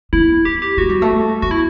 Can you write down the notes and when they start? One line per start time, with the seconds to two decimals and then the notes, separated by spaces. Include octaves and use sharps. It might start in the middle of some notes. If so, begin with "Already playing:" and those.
0.13 B3 E4
0.45 G4
0.62 G4
0.77 A3 F#4
0.89 G3
1.02 A3
1.42 B3 F#4
1.51 E4